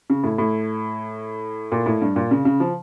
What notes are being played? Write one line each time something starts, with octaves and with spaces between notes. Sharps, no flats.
C#3
A2
A2
A#2
A2
G2
A#2
C#3
C#3
F3